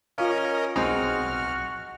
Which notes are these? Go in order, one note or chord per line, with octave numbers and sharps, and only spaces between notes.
C#4 F4 A#4 D#5 F5
B1 G#3 C4 D#4 F#4 F6